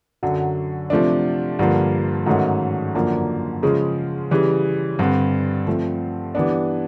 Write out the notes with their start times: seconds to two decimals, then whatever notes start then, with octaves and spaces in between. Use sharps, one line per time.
0.23 F#2 D3 F#3
0.90 C3 F3 A3 D4
1.59 G2 D3 F3 A#3
2.26 G#2 D#3 F#3 A3 C#4
2.95 F#2 D3 F3 A#3 D4
3.63 C#3 F3 G#3
4.31 C#3 E3 G3
4.99 G2 D3 G3 C4
5.67 F3 A3 C4
6.35 E3 G3 B3 D4